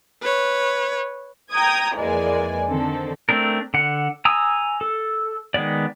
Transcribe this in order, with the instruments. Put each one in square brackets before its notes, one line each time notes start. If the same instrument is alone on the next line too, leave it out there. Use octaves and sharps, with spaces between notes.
[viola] B4 C#5
[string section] G5 A#5 D#6 G#6
F2 E3 G#3 A#3 D5 G#5
D3 D#3 C4 A4
[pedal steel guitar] A3 C4 D4 A#4
D3 F#5
G#5 A#5 D#6 E6
A4
D#3 G#3 B3 D5